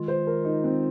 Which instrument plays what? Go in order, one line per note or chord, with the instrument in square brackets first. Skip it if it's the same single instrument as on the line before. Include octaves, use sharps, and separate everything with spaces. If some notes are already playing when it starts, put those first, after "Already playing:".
Already playing: [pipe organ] D#3 G#3 F4
[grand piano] C5
A#4
D#4
C4